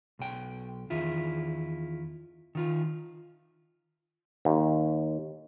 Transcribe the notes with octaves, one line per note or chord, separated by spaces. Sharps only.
B1 G5
E2 D#3 E4 F4
D#3 F4
D#2